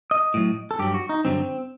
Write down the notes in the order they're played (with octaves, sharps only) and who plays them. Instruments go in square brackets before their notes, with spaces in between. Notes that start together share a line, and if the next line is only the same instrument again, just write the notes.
[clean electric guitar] D#5
A2 F#3
A4
G2 F#3 G4
F#4
D#4
G2 D3 F#3 C4